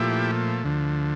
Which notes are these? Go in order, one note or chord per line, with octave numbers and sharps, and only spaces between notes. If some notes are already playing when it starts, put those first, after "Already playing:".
Already playing: A#2 F3 A3 E4 G4
D2 D3 F3